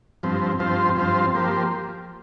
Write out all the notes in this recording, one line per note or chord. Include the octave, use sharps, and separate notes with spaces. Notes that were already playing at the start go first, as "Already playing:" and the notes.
G2 F3 C4
G2 F3 C4 F4 C5
G2 F3 C4 F4 C5
F3 A#3 G4 C5